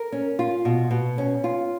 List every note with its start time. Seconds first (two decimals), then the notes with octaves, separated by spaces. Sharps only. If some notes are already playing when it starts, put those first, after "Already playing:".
Already playing: A#4
0.12 C#4
0.39 F4
0.65 B2
0.91 B2
1.18 C#4
1.44 F4